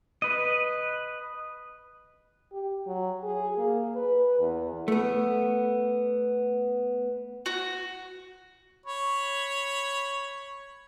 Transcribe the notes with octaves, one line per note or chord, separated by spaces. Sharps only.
B4 D#5
G4
F#3
G#4
A#3
B4
E2
A3 B3
F#4
C#5 B5